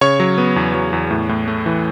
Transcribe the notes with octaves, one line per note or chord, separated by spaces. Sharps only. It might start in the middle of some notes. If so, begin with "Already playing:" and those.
C#3 C#5 C#6
F#3
B3
E2
F#3
E2
A2
A2
A3
E3